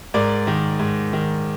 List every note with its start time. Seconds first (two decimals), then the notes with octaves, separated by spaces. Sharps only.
0.14 G#2 A#4 D5
0.47 D#3
0.79 G#2
1.13 D#3